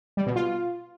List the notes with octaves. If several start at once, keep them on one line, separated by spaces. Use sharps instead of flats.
G3
B2
F4